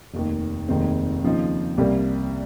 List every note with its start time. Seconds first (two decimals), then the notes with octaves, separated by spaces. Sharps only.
0.14 F1 D#2 D#3
0.68 F1 D#2 D#3 G#3 C4
1.24 D#2 C#3 F3 C4 D#4
1.78 C2 C3 G3 A#3